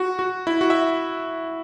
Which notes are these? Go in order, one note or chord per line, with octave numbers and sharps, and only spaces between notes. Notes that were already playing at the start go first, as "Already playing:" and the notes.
Already playing: F#4
F#4
E4
F#4
E5